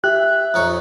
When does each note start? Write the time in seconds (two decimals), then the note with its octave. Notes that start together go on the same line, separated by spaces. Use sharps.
0.04 G4 E5 F#6
0.54 F2 D#4 C#5